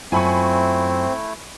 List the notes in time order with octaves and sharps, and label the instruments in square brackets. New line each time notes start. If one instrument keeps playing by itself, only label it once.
[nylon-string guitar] F#2 F4 [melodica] A3 E4 [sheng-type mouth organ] C4 [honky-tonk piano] G#5 B5 C#6